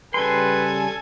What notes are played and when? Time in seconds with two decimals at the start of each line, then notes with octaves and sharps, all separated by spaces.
0.14 C#3 G3 A4 B4 G#5 C6